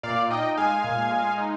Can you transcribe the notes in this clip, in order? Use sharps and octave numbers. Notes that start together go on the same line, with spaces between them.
A#2 D5 F5
D#4 D#5 G5
G#3 F5 G#5
A#2
G#3
D#4